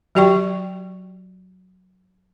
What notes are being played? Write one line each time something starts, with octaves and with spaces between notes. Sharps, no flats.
F#3 F#4 G4 D5 G5 C#6